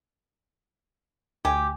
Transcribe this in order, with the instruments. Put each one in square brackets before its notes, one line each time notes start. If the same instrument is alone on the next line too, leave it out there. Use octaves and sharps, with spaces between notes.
[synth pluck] D2 G#5 [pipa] G4